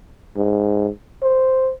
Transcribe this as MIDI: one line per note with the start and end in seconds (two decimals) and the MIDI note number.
0.37 0.89 44
1.22 1.71 72